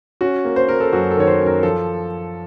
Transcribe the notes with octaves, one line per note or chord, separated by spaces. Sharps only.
C#4 F#4
A#3
C5
A#3 A#4
A4
F#2 F#4
A4
D#3 C#5
C5
F#2
A#4
F3 A4